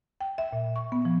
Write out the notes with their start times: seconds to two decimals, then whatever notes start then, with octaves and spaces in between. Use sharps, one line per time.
0.21 G5
0.38 E5
0.53 A#2
0.76 C#6
0.92 B3
1.05 F3